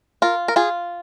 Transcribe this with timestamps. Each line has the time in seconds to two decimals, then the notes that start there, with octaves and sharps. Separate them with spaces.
0.22 F4 A#4
0.48 A#4
0.56 F4 G#4